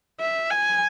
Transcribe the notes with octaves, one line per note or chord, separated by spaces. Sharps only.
E5
G#5